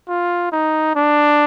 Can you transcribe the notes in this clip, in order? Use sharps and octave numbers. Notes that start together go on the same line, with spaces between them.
F4
D#4
D4